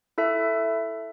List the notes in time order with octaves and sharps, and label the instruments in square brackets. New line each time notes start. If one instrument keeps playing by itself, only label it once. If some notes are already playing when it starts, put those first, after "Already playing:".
[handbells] E4 A4 E5